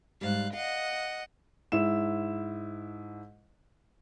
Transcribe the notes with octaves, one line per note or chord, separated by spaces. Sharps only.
G#2 G3 F5 F#6
D#5 F5 F#5
G#2 E4 E7